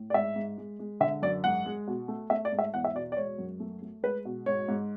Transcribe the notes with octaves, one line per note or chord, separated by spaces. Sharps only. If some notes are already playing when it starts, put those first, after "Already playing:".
Already playing: A2
D5
G#2 E5
G#2
G#3
G#3
D3 E5
F#2 D5
G#2 F#5
G#3
B2
A3
A3 E5
D5
G#2
E5
E2 F#5
E5
B2 D5
D5
G#3 C#5
F#2
A3
A3
G#3 B4
B2
G#2 C#5
G#2